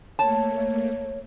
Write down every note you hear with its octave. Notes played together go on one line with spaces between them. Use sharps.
A3 A#3 C#5 A5